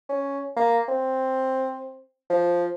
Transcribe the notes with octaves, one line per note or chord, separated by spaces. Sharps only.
C#4
A#3
C4
F3